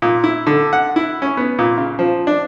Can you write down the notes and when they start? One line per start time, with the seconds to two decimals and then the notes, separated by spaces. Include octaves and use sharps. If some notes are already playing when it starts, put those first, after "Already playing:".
0.02 A#2
0.24 E4
0.47 D3
0.73 F#5
0.96 E4
1.22 C#4
1.37 B3
1.59 A#2
1.78 C#3
1.99 F3
2.27 D4